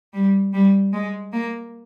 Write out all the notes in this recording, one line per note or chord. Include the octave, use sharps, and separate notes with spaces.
G3
G3
G#3
A#3